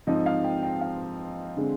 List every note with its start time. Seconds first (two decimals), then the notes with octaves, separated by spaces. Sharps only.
0.07 G#2 F3 C4 D#4 D#5
0.26 F5
0.44 G5
0.63 G5
0.81 F5
1.57 D3 G#3 C4